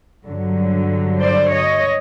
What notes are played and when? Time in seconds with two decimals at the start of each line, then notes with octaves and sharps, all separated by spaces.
0.25 G2 D3 F#3
1.19 C5 D5
1.51 C#5 D#5